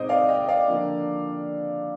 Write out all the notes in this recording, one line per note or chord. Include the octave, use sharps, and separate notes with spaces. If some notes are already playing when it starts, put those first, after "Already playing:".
Already playing: A#2 G#3 C4 D#4 C5 D#5 D6 D#6
D5 F5
D#5 G5
D5 F5
D3 F3 A#3 D4